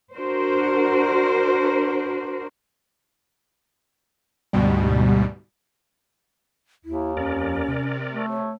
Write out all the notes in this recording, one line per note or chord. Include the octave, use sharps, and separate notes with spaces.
D4 F#4 A#4 C5
D2 G#2 B2 G3
D#2 E4
F2 C#4 A#4 D5
C3
A3
C#5